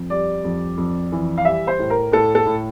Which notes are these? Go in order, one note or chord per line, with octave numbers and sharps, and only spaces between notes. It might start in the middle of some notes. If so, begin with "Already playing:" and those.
Already playing: F2
G3 D5
F2
F2
E3
F5
G3 E5
C5
A2
A#4
A2 A4
A4
A2